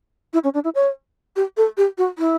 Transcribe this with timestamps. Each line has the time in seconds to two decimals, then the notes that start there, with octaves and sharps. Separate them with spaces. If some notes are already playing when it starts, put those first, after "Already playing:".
0.33 E4
0.44 C#4
0.54 D4
0.64 E4
0.75 C#5
1.36 G4
1.57 A4
1.77 G4
1.98 F#4
2.18 E4